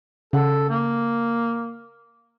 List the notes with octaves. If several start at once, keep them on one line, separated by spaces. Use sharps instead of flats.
C#3 A4 F#5
A#3